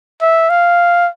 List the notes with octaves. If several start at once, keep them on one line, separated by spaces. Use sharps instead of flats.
E5
F5